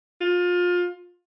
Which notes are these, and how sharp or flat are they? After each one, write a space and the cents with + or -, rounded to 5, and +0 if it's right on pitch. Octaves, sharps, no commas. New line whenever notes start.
F4 +25